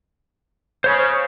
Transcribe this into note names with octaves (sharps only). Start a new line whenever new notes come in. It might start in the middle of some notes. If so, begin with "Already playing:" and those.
C#3 C5 C#5